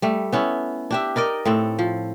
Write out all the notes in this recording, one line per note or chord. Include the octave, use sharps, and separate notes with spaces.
G3 A3
B3 C#4 E4
D4 G4 E5
D#4 A#4 D5 D#5
A2 C4 A4
F3